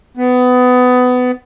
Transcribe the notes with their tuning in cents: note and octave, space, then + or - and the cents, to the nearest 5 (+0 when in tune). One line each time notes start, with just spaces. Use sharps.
B3 +20